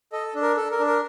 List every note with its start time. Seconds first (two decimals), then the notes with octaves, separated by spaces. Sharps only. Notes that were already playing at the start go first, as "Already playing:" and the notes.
0.12 A4 D#5
0.35 D4
0.42 A#4
0.57 A4
0.72 A#4
0.79 D4
0.87 A#4